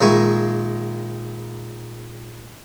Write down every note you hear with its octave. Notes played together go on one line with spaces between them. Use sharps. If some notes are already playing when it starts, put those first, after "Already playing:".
A#1 D#3 G#3 E5 G#5 C#6